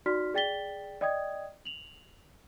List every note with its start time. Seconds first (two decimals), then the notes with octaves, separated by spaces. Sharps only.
0.06 D#4 F#4 D5 C6 F6 B6
0.34 G#4 D5 G5 A6 B6 G7
1.01 D5 D#5 G5 D#6 G#6
1.65 F7 F#7